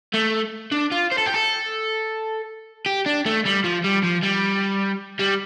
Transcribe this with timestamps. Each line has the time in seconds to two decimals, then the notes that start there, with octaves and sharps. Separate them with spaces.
0.14 A3
0.72 D4
0.92 F4
1.12 C5
1.18 A4
1.26 G4
1.34 A4
2.86 G4
3.06 D4
3.26 A3
3.45 G3
3.64 F3
3.84 G3
4.04 F3
4.23 G3
5.20 G3